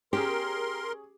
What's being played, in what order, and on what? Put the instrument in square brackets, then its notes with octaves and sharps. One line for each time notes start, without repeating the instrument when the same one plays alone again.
[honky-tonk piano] C#4 G#4 [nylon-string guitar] G4 [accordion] A#4 C6